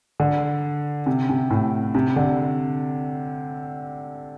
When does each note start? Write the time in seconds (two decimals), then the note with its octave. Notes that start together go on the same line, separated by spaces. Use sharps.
0.20 D3
1.06 C3
1.29 C3
1.50 A2
1.95 C3
2.16 D3